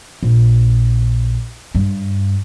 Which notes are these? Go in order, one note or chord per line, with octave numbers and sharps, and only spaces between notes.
A#1
G2